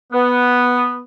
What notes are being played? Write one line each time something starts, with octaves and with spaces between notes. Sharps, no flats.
B3